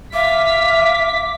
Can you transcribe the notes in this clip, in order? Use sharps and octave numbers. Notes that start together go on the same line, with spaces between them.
E5 F5 D6 B6